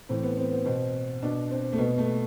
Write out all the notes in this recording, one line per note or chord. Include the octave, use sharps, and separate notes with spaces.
A2 E3 C4
B3
C4
B3
B2 C4
B2 D4
C4
A3
B2 B3
A3